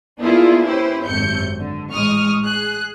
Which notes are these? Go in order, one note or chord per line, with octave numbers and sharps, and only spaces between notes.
A#3 B3 D4 E4 F4 G#4
C#4 E4 G4 B4 C5
G#1 F#2 C3 A3 G6 C#7
D3
A1 A2 G#3 C#6 D#6 F6
G#4 F#6